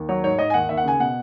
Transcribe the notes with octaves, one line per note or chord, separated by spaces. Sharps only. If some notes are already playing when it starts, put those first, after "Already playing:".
Already playing: D#2
F#3 C#5
G#2 C#5
G#2 D#5
G#5
D#2 F#5
D#2 E5
F#5
C#3 G#5
B2 F#5